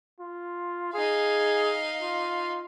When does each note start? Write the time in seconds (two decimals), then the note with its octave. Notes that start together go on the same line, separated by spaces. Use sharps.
0.20 F4
0.93 D#4 G#4 F5
2.02 F4